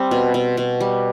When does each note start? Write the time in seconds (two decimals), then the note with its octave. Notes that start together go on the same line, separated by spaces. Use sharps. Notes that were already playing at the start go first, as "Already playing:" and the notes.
Already playing: G3 C4
0.11 B2
0.34 B2
0.57 B2
0.80 G3